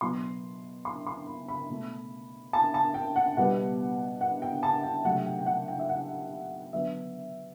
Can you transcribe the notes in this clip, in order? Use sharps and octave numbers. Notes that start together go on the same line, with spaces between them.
B2 F#3 B3 C6
C6
C6
B5
B5
B2 A3
A5
A5
G5
F#5
B2 G3 B3 F#5
F#5
G5
A5
G5
C3 F#3 A3 F#5
G5
G5
F#5
G5
E5
F#5
D3 F#3 B3 E5